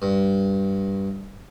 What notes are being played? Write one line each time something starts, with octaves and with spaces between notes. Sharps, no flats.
G2